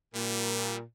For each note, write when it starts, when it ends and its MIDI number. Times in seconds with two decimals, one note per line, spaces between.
0.15 0.82 46
0.15 0.76 55